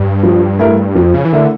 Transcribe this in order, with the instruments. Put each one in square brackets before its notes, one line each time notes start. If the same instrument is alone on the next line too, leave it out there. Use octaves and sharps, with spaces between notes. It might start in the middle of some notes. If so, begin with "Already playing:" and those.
Already playing: [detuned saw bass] G2
[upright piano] F3
A3 E4 A#4
[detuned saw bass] F2 [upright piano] F3
[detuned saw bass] C#3
E3
[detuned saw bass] D3 [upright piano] A3 E4 A#4